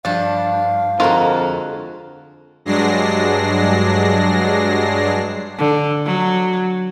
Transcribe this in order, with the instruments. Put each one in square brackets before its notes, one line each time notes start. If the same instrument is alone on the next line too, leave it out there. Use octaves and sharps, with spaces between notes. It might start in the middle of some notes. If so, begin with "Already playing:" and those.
[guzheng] G2 F3 [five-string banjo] D4 [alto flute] F5
[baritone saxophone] F2 [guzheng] D3 G#3 [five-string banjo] F4 F#4 A#4
[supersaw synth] G2 F#3 G#3 D4 A#6 C7
[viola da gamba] D3
F#3